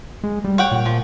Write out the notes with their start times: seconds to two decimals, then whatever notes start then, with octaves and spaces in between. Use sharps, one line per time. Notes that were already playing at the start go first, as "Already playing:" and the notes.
0.24 G#3
0.44 G3
0.58 C#5 F#5 G5
0.72 A#2
0.85 F3